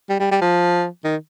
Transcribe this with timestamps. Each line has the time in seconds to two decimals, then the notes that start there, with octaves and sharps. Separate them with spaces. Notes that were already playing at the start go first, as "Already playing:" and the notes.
0.09 G3
0.20 G3
0.31 G3
0.41 F3
1.04 D#3